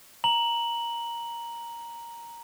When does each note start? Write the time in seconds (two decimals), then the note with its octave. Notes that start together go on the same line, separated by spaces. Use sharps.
0.24 A#5 F#7